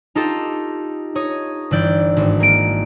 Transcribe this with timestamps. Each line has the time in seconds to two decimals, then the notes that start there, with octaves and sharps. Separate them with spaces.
0.15 D#4 F4 G4 A4
1.15 D#4 C#5 D#6
1.71 G1 E3 E4 D5 F#6 G6
2.17 G#1
2.40 A#3 D7